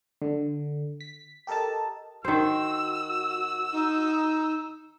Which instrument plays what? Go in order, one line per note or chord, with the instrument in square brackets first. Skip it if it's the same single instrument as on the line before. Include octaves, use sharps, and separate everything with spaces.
[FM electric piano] D3
B6
G4 A4 A#4 D#5 A5
[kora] D#3 C5 [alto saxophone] F#4 [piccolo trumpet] E6
[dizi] D#4